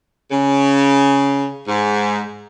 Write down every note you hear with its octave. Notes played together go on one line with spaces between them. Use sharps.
C#3
G#2